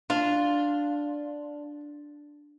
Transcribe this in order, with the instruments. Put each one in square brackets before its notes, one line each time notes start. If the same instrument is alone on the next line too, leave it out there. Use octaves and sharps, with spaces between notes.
[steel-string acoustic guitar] D4 [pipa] F4